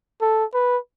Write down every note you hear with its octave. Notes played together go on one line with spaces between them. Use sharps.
A4
B4